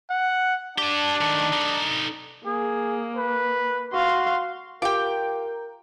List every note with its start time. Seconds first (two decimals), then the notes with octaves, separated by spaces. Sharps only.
0.10 F#5
0.78 D4 G4 A5
1.21 D#3 A3
1.53 D#4 A4
2.46 A#3 G#4
3.17 B4
3.93 F#4 F5 C6
4.82 F4 G4 A#4 G5 D6